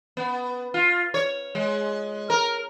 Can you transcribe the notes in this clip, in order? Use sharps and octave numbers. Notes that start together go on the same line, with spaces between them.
B3
F4
C#5
G#3
A#4